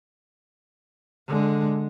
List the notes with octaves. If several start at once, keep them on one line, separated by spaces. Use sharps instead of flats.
D3 G#3